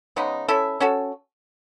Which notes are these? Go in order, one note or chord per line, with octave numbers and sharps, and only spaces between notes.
C#3 G#3 B3 D#4
C#4 E4 A4 E5
C#4 F#4 A4